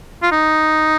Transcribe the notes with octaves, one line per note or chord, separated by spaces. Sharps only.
F4
D#4